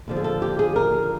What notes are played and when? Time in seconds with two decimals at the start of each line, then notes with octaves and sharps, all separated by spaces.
0.08 D#2 D3 F3
0.16 G#4
0.24 A4
0.42 G4
0.59 G#4
0.76 A#4